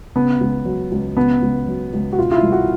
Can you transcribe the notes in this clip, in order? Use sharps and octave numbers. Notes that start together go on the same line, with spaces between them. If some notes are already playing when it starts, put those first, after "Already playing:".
C#3 B3
C#2
F#3
C#2
C#3 B3
C#2
F#3
C#2
F#4
B2 F4
F4
E4
C2
F#4